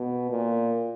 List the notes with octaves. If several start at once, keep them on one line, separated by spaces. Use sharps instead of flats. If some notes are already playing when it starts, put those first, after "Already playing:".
Already playing: B2
A#2